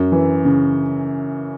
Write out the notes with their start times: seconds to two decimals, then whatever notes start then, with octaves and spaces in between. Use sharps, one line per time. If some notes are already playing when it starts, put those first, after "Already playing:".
Already playing: F#2
0.12 E3
0.45 C#3